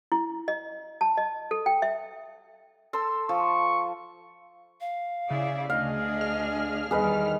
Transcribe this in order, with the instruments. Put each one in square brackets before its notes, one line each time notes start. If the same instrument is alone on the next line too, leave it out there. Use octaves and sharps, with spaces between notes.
[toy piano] E4
D#5
A5
D#5
A4
G5
E5
[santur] A4 C6 E6
[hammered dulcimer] F3 [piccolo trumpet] C#6
[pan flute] F5
[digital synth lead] C#3 [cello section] E4 G#4 D5
[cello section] D2 D4 G#4 [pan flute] D#5 [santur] F5
[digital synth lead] F6
[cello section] E2 D#3 G3 [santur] G#4 B4 D#5